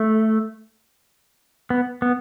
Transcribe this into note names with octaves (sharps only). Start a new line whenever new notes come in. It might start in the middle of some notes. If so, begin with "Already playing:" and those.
Already playing: A3
B3
B3